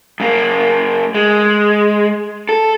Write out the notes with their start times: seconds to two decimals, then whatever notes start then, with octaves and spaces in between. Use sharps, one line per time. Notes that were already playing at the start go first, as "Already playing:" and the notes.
0.20 F#2 A#3
1.15 G#3
2.49 A4